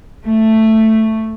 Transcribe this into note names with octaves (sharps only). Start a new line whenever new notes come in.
A3